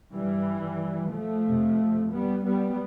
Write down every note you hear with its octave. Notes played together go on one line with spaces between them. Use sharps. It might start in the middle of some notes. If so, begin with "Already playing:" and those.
G2 E3 G3
F3 A3
F2 C3
G3 B3
G3 B3